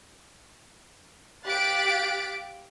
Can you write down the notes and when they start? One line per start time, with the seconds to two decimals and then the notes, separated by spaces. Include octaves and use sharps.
1.45 G4 F5 F#6 A6 B6 D7